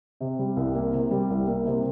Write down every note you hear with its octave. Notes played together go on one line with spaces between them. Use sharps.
C3
G3
C2
A#3
C3
G3
C2
A#3
C3